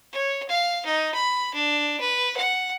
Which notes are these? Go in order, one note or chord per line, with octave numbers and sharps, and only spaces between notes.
C#5
F5
D#4
B5
D4
B4
F#5